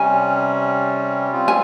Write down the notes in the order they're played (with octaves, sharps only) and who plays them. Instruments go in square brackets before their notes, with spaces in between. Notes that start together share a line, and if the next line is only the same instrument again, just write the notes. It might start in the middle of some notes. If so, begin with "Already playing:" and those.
Already playing: [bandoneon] C3 G3 C#4 [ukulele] G#5
[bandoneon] G3 C4 F4
[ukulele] G#5